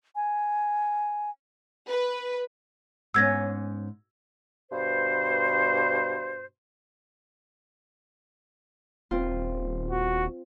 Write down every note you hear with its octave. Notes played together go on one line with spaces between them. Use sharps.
G#5
B4
G#2 B3 C#4 E6 G#6 A#6
G2 B2 C5
D#1 C4 F4
F#4